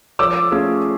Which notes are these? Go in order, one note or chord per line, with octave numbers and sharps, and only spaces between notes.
F3 D6 E6
A3 C#4 F4 G#4